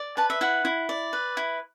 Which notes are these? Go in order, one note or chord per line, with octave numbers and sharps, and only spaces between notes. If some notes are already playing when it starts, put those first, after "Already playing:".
Already playing: D5
B4 A5
E5
E4 F#5
E4
D5
B4
E4